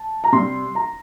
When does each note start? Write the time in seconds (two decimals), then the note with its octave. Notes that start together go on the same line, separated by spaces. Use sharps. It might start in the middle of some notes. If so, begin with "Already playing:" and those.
Already playing: A5
0.24 A#5
0.32 C3 G3 C6
0.75 A#5